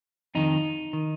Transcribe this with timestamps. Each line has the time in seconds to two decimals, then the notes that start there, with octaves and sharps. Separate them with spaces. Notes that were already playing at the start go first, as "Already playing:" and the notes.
0.35 F2 D#3 D#4
0.93 D#3